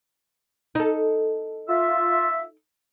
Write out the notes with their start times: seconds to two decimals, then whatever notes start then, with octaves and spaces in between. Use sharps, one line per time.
0.75 D#4 A4
1.69 F4 E5